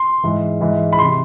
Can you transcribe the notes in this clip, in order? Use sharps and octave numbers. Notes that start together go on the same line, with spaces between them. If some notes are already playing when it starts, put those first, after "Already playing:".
Already playing: C6
G#2 E3
G#2 E3
B5
C3 E3 C6